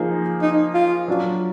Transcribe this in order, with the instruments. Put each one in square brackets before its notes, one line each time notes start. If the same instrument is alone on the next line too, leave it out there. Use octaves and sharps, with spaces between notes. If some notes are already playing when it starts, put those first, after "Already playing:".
Already playing: [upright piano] F3 A#3 D#4 G#4
[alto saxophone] D#4
F4
[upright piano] F#3 D4 F4